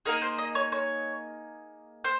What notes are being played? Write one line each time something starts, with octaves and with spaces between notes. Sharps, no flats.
A#3 D#4 G#4 A#4
C5
D#5
C#5
C#5
C5